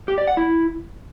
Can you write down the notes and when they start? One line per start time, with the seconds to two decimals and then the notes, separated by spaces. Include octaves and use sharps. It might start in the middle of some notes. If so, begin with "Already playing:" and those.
0.08 G4
0.18 D5
0.27 F#5
0.37 E4